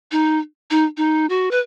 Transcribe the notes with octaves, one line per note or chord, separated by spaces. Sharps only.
D#4
D#4
D#4
F#4
B4